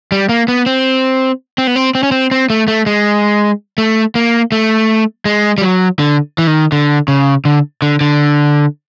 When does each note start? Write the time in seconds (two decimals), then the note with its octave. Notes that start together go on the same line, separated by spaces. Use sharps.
0.12 G3
0.29 A#3
0.48 B3
0.66 C4
1.58 C4
1.67 B3
1.76 C4
1.95 C4
2.03 C#4
2.12 C4
2.31 C4
2.50 A3
2.68 A3
2.86 G#3
3.78 A3
4.15 A#3
4.52 A3
5.25 G#3
5.58 G3
5.62 F#3
5.99 D3
6.38 E3
6.47 D#3
6.72 D3
7.08 C#3
7.45 D3
7.82 D3
8.01 D3